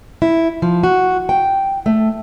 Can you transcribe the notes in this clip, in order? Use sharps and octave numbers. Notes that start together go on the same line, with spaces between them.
E4
F3
F#4
G5
A3